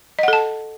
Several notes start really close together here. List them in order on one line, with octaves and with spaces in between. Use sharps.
D#5 F#5 A4 A5